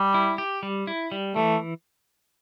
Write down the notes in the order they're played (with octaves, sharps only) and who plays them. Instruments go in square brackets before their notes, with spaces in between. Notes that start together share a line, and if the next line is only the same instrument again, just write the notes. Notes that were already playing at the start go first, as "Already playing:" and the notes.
Already playing: [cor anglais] G3
[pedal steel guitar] E4
G4
G3
E4
G3
[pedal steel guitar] E3 [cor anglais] A3